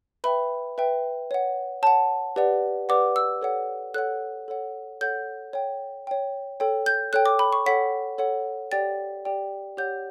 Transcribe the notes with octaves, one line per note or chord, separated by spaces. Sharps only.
B4 E5 G5 B5
B4 E5 G5
C#5 F#5
C#5 F#5 A5
G4 B4 D5 F#5
G4 B4 D5 F#5 D6
E6
A4 C#5 F#5
A4 C#5 F#5 F#6
A4 C#5 F#5
A4 C#5 F#5 G6
C#5 G5
C#5 G5
A4 C#5 G5
G6
A4 C#5 G5 F#6
D6
B5
C#6
A4 C#5 F#5 B6
A4 C#5 F#5
G4 D5 G5 A6
G4 D5 G5
G4 C#5 F#5 G6